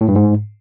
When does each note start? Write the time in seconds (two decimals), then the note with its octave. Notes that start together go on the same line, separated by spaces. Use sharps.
0.01 A2
0.08 G2
0.16 G#2